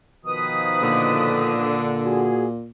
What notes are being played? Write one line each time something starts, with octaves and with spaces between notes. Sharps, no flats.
B2 D#3 F3 B4 D#6
A#2 D3
F#4 G#4